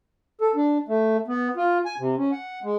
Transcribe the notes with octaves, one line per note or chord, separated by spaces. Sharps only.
A4
D4
A3
B3
F4
G#5
C3
C#4
F#5
G#3